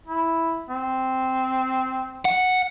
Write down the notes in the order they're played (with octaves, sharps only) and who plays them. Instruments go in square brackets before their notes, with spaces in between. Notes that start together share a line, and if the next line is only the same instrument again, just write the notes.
[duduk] E4
C4
[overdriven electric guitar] F#5